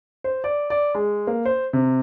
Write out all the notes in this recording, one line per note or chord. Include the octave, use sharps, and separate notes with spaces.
C5
D5
D5
G#3
A#3
C5
C3